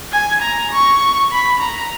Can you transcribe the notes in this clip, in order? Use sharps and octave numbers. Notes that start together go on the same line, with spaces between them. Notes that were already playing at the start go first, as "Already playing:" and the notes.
G#5
A#5
C#6
B5
A#5